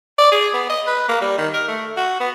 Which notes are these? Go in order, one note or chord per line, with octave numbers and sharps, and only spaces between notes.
D5
G#4
B3
D#5
B4
A#3
G3
D#3
A#4
A3
F#4
B3